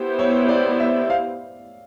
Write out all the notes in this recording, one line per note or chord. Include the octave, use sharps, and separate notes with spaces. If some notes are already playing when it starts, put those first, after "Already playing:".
Already playing: B3 E4 G4 C5
C#5
D5
E5
F5